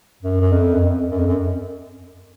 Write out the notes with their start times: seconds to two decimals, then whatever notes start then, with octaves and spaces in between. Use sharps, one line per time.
0.22 F#2
0.41 F#2
0.52 F2
0.74 F#2
0.81 F2
1.11 F#2
1.19 F2
1.27 F#2